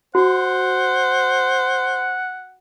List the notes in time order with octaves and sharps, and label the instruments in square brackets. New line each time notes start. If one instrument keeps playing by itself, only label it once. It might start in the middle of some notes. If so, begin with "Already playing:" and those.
[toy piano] F#4 [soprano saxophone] C5 [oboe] F#5